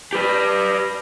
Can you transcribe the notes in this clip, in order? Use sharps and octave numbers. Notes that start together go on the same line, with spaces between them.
G4 B4